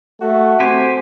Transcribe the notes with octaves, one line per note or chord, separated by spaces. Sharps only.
A3 F#4
C4 G4 C5 G#5